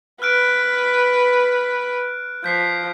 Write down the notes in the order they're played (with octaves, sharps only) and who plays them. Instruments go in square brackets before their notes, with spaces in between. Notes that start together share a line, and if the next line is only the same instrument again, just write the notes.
[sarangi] B4 [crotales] F6 F#6 D7
[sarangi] F3 [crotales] G6 B6 C7